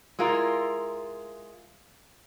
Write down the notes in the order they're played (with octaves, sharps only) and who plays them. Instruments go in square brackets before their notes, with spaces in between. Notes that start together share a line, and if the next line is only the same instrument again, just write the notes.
[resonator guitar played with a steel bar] G#3 E4 F4 A#4